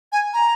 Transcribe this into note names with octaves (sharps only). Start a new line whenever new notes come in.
G#5
A#5